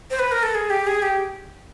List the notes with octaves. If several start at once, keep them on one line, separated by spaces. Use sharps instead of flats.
C5
B4
A#4
A4
G#4
G4
G#4
G4